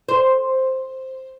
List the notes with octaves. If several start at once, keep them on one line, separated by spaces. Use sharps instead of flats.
C5